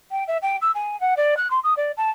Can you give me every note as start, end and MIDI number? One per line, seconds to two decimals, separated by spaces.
0.11 0.24 79
0.28 0.38 76
0.42 0.57 79
0.62 0.71 88
0.75 0.99 80
1.00 1.14 78
1.17 1.35 74
1.37 1.48 90
1.51 1.59 84
1.64 1.74 87
1.77 1.92 74
1.97 2.10 81